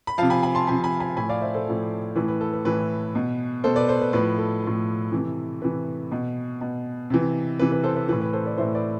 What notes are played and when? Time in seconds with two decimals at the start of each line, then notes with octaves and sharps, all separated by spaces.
0.07 B5
0.18 C3 F3 F5 A5
0.30 G#5 B5
0.43 G#5 B5
0.55 A5 C6
0.67 C3 F3 G#5 B5
0.84 G#5 B5
1.00 G#5 B5
1.17 A2 F3 G#5 B5
1.29 D5 F5
1.42 C5 E5
1.54 A4 C5
1.66 A2 F3
2.16 A2 E3 B4
2.28 B4
2.41 A4
2.53 B4
2.65 A2 E3 B4
3.15 B2
3.64 B2 A4 C5
3.76 B4 D5
3.88 A4 C5
4.01 B4
4.13 A2 F3 B4
4.38 A4
4.62 A2 F3
5.12 C3 E3
5.62 C3 E3 B4
6.12 B2
6.61 B2
7.10 C3 E3
7.59 C3 E3 B4
7.72 B4
7.84 A4 C5
7.96 B4
8.09 E3 B4
8.13 A2
8.21 B4
8.33 A4 C5
8.46 B4 D5
8.58 A2 E3 C5 E5
8.75 B4 D5